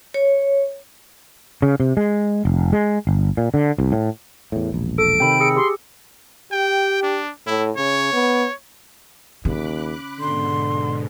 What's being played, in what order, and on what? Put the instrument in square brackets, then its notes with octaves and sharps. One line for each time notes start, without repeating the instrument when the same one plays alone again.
[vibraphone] C#5
[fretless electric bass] C#3
C3
G#3
F1
G#3
G1
A#2
D3
C2
A2
E2 A2
E1 A#1
[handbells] A4 [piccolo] D7
[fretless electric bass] C3 D#3 [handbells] G5 B5
[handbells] G#4 E6 C#7
[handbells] G4 [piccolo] C6
[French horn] G4 [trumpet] G5
[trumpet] D4
[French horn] A2 [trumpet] E4
[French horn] C#3 [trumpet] C#5
[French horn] B3
[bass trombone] D#2 [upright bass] C#3 [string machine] B5 D6 F#6
[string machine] G#2 B2 [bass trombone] D3 [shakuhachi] C6